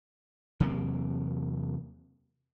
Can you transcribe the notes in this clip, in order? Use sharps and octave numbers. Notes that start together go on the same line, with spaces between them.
E2 C3 F#3 A#3